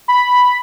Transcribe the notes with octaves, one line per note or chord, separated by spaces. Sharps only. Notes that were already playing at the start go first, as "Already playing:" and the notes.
B5